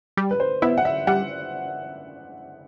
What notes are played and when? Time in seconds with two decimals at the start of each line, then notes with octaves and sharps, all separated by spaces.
0.17 G3
0.31 B4
0.40 C5
0.62 B3 E4 E5
0.78 F#5
0.85 E5
1.07 G3 F#5